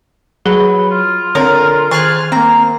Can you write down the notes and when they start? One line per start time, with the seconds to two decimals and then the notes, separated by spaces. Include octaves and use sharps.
0.46 F#3 G#4 B4
0.91 F4
1.35 D3 C4 A#4 C#5
1.91 D#3 G#4 F6 F#6 A6
2.32 A#3 C4 A#5